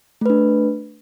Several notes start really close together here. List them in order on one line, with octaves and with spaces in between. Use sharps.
A3 B4 D4